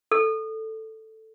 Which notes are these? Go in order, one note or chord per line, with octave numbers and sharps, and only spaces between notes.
A4